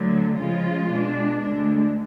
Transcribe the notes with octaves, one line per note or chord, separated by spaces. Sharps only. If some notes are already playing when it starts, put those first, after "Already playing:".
Already playing: D2 D3 F#3 A3
C#3 F3 G#3 F4
B2 G#3 D4
D2 D3 G#3 D4